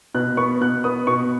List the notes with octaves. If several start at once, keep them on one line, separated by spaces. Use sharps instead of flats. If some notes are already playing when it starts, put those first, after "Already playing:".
B2 F#6
B3 C#6
B2 F#6
B3 D#6
B2 C#6